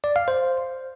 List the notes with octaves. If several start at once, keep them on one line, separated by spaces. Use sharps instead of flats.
D5
F5
C5